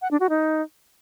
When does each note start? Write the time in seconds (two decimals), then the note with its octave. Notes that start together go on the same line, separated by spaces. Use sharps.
0.02 F#5
0.11 D4
0.20 F#4
0.30 D#4